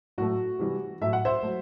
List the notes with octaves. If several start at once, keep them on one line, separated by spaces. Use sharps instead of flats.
A2 F#3 A3 F#4
C3 E3 G3
A2 F#3 A3 E5
F#5
C5 E5
F#3 A3